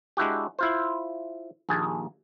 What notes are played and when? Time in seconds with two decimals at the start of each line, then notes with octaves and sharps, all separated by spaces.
0.17 G#3 D4 E4 F#4 G4
0.59 E4 F4 C5
1.69 A#1 D#2 G#4 A5